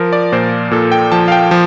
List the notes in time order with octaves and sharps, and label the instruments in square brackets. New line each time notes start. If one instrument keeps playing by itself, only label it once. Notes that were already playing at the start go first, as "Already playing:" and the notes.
Already playing: [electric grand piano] F3 A#4
D5
A#2 C5
A#2 A4
G5
F3 A5
F5
G5
F3